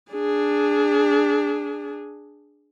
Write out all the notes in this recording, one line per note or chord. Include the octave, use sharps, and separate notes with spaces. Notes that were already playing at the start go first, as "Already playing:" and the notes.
D4 G#4